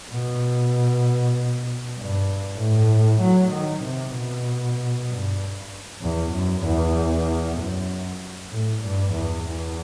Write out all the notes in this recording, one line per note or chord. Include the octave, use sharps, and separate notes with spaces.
B2
G2
A2
F#3
D#3
C3
B2
G2
E2
F#2
E2
F#2
A2
G2
E2
E2